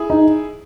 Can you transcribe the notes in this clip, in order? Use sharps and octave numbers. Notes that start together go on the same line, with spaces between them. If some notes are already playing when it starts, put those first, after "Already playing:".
Already playing: E4 G#4
D#4